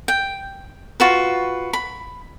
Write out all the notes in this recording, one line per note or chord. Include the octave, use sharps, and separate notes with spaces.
G5
F4 F#4 B4
B5